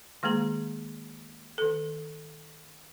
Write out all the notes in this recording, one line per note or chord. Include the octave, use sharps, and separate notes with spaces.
D#3 G#3 A#3 G#4 A#5
D#3 A4